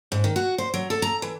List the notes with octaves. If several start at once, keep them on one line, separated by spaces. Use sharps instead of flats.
G#2
D#3
F#4
C5
F#3
A4
A#5
E3